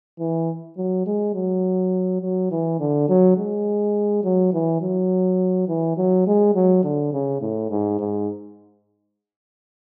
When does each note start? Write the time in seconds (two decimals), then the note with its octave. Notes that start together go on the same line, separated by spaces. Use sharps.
0.20 E3
0.77 F#3
1.06 G#3
1.35 F#3
2.22 F#3
2.51 E3
2.80 D3
3.09 F#3
3.37 G#3
4.24 F#3
4.53 E3
4.81 F#3
5.68 E3
5.97 F#3
6.27 G#3
6.55 F#3
6.84 D3
7.13 C#3
7.41 A2
7.71 G#2
7.99 G#2